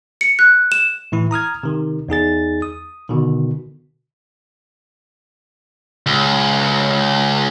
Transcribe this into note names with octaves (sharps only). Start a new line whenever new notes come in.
C#7
F#6
E7
A2 E3 E4
A#5 D#6 F6 G#6
C3 D#3
E2 D#4 G#4 A6
D#6
B2 D3 D#3
C#2